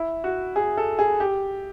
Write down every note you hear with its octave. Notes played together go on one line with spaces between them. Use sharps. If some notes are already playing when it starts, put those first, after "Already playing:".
Already playing: E4
F#4
G#4
A4
G#4
G4